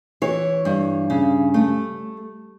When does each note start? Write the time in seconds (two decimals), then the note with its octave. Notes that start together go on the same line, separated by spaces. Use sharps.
0.22 E3 C#5
0.65 G2
1.10 C#3
1.54 A3